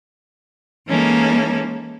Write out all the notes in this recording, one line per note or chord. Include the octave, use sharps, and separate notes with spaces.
E3 G#3 A#3 C#4 D#4 A4